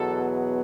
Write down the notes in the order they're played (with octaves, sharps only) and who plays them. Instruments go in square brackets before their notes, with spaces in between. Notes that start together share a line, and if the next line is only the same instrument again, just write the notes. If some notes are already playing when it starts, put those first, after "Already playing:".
Already playing: [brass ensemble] E2 B2 F#3 B3 A4